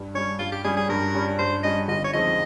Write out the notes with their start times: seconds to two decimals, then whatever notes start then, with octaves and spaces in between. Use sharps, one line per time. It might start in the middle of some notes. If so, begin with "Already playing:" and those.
Already playing: G2
0.15 G3 C#4 C#5
0.39 G2 F4
0.52 G4
0.64 G3 C#4 G#4
0.77 G#4
0.89 G2 A#4
1.15 G3 C#4
1.39 G2 C5
1.63 G3 C#4 D#5
1.88 G1 D#5
2.04 C#5
2.13 F2 D#3 G#3 C4 D#5